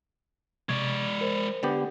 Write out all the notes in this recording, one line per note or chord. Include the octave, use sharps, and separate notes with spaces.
C3 G#3 D5 C#6 G#6
A#4 C5
D3 B3 G4